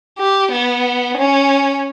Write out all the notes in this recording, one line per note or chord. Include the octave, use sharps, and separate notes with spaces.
G4
B3
C#4